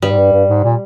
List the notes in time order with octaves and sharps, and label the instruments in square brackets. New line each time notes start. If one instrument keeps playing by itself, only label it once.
[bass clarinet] G2 [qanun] G3
[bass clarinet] G#2
G2
G2
G#2
A#2